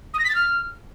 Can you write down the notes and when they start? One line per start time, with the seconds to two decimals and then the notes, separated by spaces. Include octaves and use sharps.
0.14 D#6
0.19 A#6
0.24 B6
0.30 A6
0.35 F6